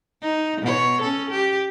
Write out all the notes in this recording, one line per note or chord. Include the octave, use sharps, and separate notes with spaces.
D#4
B2 C#5
C#4 A4
G4